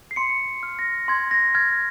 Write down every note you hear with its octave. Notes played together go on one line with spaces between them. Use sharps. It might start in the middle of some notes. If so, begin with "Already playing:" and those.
C7
C6 C#7
F6
A#6
C6 G#6
A#6
F6 G#6